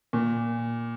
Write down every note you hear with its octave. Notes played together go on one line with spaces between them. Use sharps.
A#2